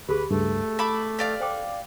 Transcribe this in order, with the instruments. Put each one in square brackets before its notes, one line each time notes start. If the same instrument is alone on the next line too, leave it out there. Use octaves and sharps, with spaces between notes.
[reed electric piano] D2 B5 [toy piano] G4 G#4 [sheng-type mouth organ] B4
[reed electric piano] C#2 G2 [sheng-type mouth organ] A3
[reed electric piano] A4 [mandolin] E5 B5 D6
[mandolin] G4 D5 F5 [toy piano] B4
[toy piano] C5 G5 D6